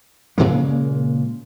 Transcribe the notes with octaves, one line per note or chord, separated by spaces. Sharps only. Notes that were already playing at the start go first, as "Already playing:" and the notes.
A#2 C#3 G#3 A#3